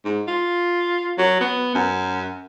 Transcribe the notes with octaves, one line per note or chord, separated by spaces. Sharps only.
G#2
F4
F#3
B3
F#2